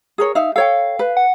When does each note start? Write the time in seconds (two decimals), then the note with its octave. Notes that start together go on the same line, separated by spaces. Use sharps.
0.18 G#4 A#4 C#5
0.35 D#4 E5 F5
0.56 A4 C#5 F5 G5
0.99 B4
1.17 F#5